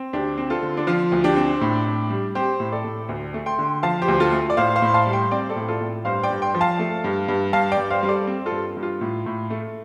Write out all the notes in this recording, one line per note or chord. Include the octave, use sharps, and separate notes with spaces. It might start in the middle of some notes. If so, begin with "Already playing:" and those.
Already playing: C4
D2 D4 G4
C4
F4 A4
D3
D4
F3 F4
D2
D4 G4
C4
A2
A2
G3
C4 G4 C5
A2
A4 D5
A2
D2
A3
G5 C6
D3
F3 F5 A5
G4 C5
D2
F4 A4
A3
D5
A2 C5 F5
C5 F5
A2
C6
F5 A5
G3
G5 C6
C4 D5 G5
A4 D5
A2
F4 A4
A2
G2 C5 F5
D5 G5
G2
G5 C6
F3
F5 A5
A3
G2
G2
G2 F5 A5
D5 G5
G2
C5 F5
G3
A4 D5
C4
F4 A4
G2
G2
F4
A2
A2
A3